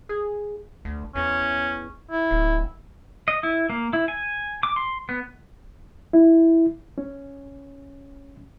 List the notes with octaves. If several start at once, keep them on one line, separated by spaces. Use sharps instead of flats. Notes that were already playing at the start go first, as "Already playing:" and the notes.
G#4
D2
E2 C#4
E4
D1
D#5
E4
A#3
E4
G#5
D6
C6
B3
E4
C#4